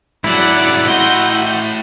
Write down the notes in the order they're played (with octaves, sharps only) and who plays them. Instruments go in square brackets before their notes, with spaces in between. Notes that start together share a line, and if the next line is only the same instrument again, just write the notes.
[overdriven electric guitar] G#2 F#3 [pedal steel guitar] E4 [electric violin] D5 F#5
[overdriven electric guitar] A2 C6 [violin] F#4 [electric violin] D#5 G6